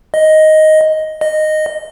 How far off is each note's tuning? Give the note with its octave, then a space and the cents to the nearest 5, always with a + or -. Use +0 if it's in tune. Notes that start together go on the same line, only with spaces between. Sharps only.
D#5 +5
D#5 -10